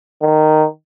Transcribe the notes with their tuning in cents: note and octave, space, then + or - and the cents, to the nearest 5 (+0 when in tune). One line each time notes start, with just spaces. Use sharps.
D#3 -10